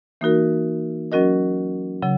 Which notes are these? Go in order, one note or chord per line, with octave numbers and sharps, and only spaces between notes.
E3 A#3 D#4 F#4 A#4
F#3 C#4 F#4 A#4 D#5
C#3 F#3